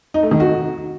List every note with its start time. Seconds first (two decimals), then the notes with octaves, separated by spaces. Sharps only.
0.14 D#4
0.23 A3
0.31 D#3
0.40 F#4